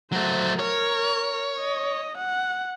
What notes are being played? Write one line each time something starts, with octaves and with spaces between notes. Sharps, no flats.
F#3 A3 C5
A#4 C#5
D#5
F#5